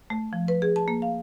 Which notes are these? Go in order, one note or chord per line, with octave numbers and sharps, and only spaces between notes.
A3
F3
B4
G#4
A5
A#3
F5